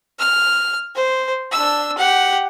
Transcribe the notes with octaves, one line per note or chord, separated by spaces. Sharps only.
F6
C5
D4 E6
G4 F#5